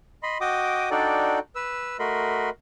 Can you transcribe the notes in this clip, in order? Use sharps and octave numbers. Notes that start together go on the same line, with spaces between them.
D#5 B5 C6
F#4 D#5 G5 D6 D#6
D4 D#4 F#4 A4 D5 G5
B4 E6
A3 F#4 A#4 D#5 B5 C6